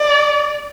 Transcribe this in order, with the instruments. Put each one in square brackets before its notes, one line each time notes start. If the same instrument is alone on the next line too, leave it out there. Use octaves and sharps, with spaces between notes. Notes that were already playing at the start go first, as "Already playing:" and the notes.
Already playing: [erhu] D5